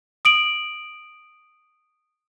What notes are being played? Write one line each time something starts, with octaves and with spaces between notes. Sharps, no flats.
D#6 D7 F#7